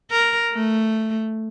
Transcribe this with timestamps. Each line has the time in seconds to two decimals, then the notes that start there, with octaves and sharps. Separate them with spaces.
0.11 A#4
0.53 A3